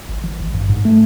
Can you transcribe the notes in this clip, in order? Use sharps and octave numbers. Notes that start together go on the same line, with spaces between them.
G#1
E3
G#1
G2
G#2
A3